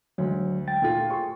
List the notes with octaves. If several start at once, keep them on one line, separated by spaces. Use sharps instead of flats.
D2 F#3 G#3
G5 A6
A#2 A3 F4
G#4 C6 C#6